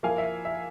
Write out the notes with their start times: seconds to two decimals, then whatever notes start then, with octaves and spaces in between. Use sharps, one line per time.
0.03 F3 A#3 E4 F5 G#5
0.18 E5
0.45 E5